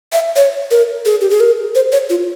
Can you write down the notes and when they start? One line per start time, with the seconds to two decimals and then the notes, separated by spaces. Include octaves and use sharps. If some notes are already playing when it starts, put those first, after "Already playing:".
0.12 E5
0.36 C#5
0.71 A#4
1.05 G#4
1.21 G4
1.30 G#4
1.40 A#4
1.75 C5
1.92 C#5
2.10 F4